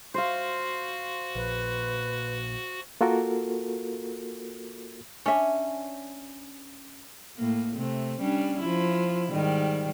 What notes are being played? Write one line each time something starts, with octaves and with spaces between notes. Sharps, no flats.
F#4 C5 F5
A#1 B4
A#3 F4 F#4 A4 A#4
C#4 D4 E5
A2 A#3
C3 A3
G3 C#4 D4
F3 E4
G#2 D#3 G3